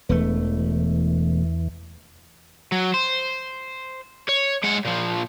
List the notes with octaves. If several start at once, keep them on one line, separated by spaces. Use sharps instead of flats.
E1 E2 E3 A3
F#3
C5
C#5
G#3 F#5
A#2 F3